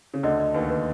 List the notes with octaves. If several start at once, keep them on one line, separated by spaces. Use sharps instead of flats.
C#3
D2 D3 D#5
D#5
D#2 D#3 B4
B4